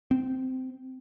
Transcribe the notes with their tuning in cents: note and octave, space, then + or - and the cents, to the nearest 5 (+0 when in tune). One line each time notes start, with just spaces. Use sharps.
C4 -15